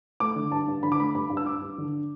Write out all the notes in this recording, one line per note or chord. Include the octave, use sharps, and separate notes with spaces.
A3 D6
D3
G2 A5
G2
D3 B5
D6
A3 B5
G2 B5
G2
E6
G2 D6
G2
D3